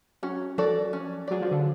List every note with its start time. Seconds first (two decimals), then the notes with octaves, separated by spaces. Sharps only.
0.23 F#3 C#4
0.58 F3 F#4 A4 D5
0.93 C#4
1.28 F#3 G#4 D5
1.41 F3
1.51 D3